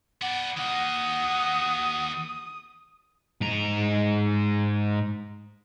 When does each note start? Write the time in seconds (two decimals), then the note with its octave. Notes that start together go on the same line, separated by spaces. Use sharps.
0.21 B3 D5 F#5
0.57 D#2 A#3 F#5 D#6
3.41 G#2 A#5